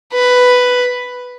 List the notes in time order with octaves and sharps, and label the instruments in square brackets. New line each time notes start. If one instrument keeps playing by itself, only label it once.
[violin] B4